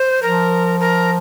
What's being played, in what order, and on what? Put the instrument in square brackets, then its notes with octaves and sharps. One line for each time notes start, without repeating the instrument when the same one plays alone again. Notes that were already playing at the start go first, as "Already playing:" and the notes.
Already playing: [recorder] C5
[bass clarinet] F3 [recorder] A#4
[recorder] A#4